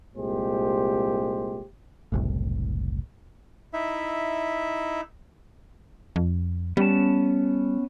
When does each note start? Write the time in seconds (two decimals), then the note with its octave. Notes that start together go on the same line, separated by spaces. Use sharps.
0.16 C2 A#2 G#3 G4 C5
2.12 F#1 C2 A2
3.73 D#4 E4 E5
6.16 F2
6.77 G3 B3 C#4 A5